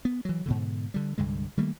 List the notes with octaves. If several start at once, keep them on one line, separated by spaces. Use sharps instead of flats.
B3
E3 F#3
G#2 B2 D3
D3 G3
C2 G2 D3 G#3
D#3 G3 A3 A#3